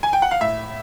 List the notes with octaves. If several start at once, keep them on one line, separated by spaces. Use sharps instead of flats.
G#5
G5
F#5
F5
A2 E5